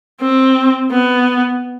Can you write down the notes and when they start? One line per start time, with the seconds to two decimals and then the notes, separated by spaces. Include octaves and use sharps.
0.21 C4
0.91 B3